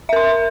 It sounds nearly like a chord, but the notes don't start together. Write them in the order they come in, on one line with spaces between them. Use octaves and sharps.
E5 A#4 C6